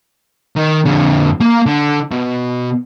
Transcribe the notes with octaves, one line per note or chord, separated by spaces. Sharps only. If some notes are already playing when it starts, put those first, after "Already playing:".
D#3
F2 D3
A#3 F5
D3
B2